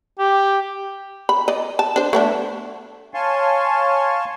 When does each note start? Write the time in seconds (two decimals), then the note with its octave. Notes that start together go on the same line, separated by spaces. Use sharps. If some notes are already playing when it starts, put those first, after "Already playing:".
0.19 G4
1.29 B5
1.48 D5 D#5
1.79 A5
1.96 D4 C5
2.13 A3 B3 D4
3.14 C#5 F5 G#5 A5 C6 C#6